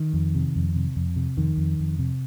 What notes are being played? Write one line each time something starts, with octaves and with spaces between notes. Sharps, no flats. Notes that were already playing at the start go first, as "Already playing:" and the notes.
Already playing: D#3
F2
C3
F2
C3
F2
C3
F2 D#3
F2
F2
C3